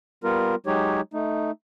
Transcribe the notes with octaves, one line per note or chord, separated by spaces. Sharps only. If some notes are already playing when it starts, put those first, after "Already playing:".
G3 B3 F4 A#4
F#3 G#3 D#4 G4 C#5
A3 D#4